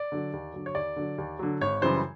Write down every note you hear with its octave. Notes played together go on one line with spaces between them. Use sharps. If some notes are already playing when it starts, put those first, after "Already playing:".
Already playing: D5
D3 F#3
D#2
D3 F#3
C#5
D#2 D5
D3 F#3
D#2
D3 F#3
G#1 C#5
F#2 C#3 E3 G3 C5